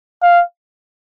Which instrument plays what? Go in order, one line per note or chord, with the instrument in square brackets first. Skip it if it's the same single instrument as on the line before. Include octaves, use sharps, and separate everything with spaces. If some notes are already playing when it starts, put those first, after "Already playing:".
[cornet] F5